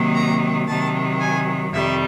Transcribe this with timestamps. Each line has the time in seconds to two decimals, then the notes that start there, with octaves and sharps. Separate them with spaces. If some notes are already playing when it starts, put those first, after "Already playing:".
Already playing: C3 D#3 F#3 A#3
0.15 A#5
0.68 C3 D#3 F#3 A5
1.21 G#5
1.74 F2 C3 D#3 G3 E5